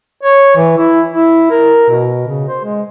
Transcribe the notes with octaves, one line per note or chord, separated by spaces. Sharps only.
C#5
E3
E4
E4
A#4
B2
C#3
C5
G#3